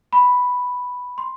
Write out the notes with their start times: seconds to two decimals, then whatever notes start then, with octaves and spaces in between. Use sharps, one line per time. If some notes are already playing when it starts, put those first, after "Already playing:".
0.13 B5
1.18 C6